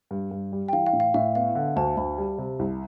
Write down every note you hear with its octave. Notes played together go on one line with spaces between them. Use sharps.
G2
G2
G3
G5
E3 F5
F5
A2
F5
A2 E5
B3 F5
D3
D2 A5
D2 B5
G3
C3
C2